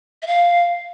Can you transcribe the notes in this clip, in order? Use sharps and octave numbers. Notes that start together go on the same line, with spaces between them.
E5
F5